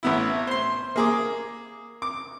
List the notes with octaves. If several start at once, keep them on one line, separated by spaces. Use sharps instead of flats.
A1 B3 E4
C5 C6
A#3 G#4 D6
D6